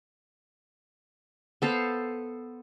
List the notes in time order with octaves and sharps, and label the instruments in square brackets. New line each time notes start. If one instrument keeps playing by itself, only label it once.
[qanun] B3 A4 C5 F5